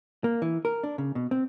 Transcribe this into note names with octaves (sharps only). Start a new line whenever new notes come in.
A#3
E3
A#4
D4
C#3
B2
C4